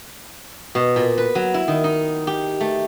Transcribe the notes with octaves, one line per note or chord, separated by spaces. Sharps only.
B2
A#2
B4
F#3
E4
D#3
D#4
G4
A3